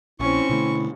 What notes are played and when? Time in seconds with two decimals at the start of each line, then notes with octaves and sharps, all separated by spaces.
0.20 A#1 C4 C#4 E4 C#6
0.50 B2 D3 A3 E4